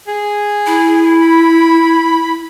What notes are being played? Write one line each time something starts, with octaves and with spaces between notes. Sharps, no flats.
G#4
E4
B5